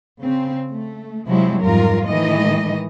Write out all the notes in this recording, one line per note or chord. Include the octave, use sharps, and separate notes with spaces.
C#3 C4
A3
C3 F3 F#3 G#3 C4 E4
F2 G#2 G3 F4 A#4
A2 D#3 E3 G#3 D#5